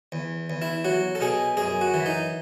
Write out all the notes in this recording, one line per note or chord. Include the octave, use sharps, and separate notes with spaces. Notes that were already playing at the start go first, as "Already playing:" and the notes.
E2
E2
E4
F#3 F#4
A4
B2 G#4
F#2 G#4
F#4
E3
D#4